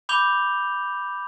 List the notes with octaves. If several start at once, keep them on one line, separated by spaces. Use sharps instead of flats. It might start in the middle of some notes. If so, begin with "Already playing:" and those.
B5 D6 G6 F7 G7